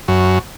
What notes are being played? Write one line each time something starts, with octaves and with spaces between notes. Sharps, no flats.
F#2